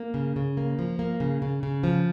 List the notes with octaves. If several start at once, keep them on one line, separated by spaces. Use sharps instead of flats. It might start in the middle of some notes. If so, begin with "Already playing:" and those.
Already playing: A#3
C#3
C#3
A#3
F3
A#3
C#3
C#3
C#3
F3